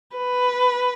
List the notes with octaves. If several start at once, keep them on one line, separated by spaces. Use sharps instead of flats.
B4